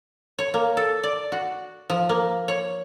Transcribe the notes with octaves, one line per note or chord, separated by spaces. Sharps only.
C#5
A#3
A4
D5
F#4
F3
A#3
C#5